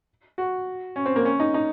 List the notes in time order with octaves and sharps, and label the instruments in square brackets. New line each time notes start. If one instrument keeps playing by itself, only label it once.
[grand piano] F#4
C#4
C4
A#3
C#4
D#4
D#4